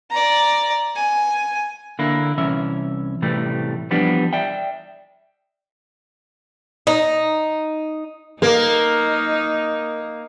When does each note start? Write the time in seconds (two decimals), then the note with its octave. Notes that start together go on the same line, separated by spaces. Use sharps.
0.10 D5 A#5
0.96 G#5
1.99 D3 A#3 E4
2.38 C2 E3 C#4 E5
3.22 A2 C3 E3 G3 A3
3.91 E3 F3 G3 B3 D4
4.33 D5 E5 G5
6.87 D#4
8.42 A#3 D#4 A#4